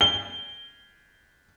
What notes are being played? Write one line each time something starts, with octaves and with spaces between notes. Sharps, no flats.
G7